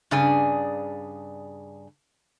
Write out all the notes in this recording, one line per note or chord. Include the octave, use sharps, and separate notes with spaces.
G2 C#3 D4 G#4 G#5